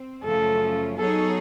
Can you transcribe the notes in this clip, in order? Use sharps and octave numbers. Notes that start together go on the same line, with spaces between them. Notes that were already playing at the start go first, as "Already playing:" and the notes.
Already playing: C4
F#2 C#3 F3 A3 C#4 A4
F#3 B3 D#4 G#4 A4 C#5